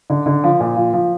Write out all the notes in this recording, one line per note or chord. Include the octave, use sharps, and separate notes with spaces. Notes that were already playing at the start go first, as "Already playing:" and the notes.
D3
D3
F3
A#2
F3
F3